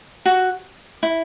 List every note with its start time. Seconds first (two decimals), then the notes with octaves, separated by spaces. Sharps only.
0.26 F#4
1.03 E4